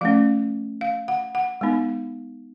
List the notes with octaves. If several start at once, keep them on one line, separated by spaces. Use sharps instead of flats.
F3 A3 C#4 F5
F5
F#5
F#5
G#3 B3 D#4